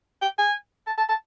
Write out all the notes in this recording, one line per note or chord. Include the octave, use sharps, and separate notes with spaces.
G5
G#5
A5
A5
A5